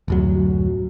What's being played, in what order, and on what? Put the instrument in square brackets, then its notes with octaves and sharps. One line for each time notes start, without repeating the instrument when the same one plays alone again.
[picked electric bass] D1 F#2 F#3